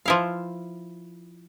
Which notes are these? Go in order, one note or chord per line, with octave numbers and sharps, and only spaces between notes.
F3 E4 F5